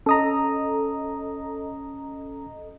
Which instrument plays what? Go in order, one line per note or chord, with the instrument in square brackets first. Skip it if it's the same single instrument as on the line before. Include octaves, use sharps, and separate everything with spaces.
[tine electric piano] C#4 D#6 [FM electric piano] A4 D#5 A#5